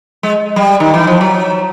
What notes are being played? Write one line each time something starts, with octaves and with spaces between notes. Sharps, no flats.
G#3
G3
D#3
E3
F3
F#3